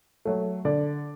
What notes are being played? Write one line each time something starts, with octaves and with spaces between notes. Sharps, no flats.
F#3 A3
D3 D5